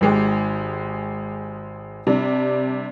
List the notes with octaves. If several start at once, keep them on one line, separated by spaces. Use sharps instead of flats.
G#1 G#3 G4
C3 G3 D4